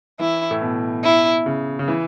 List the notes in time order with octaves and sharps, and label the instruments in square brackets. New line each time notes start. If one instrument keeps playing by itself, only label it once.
[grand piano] E3 [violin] E4
[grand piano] A2
B2
[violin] E4
[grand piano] C#3
C#3
E3